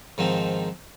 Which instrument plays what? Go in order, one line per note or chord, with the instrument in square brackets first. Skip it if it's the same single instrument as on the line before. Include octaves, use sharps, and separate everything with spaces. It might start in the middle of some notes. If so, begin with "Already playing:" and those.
[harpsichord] G#2 D#3 F3 C4